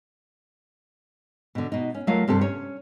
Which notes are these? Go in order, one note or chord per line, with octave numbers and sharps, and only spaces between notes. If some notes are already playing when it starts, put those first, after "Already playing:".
B2 D3
B2 D#4
C#4
F#3 A3 A#3 F4 F5
G2 C3 C4 A4
C#4 C#5